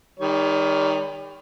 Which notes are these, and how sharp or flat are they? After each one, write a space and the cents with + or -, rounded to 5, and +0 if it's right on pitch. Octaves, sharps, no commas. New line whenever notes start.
D#3 +0 G3 +35 C#5 +45